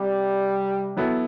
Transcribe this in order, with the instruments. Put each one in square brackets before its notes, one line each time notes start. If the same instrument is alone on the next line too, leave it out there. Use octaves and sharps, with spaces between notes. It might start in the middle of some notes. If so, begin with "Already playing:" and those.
Already playing: [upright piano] C3 [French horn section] G3
[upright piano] F#3 B3 E4 A4